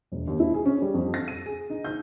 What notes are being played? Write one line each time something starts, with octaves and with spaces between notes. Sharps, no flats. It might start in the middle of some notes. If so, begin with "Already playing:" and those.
E1
D#2
E4
G#4
C#4
G3
F2
A#6
D#7
G#4
D#4
G6